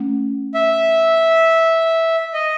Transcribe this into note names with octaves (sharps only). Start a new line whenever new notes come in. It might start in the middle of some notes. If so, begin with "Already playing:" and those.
Already playing: A3 C#4
E5
D#5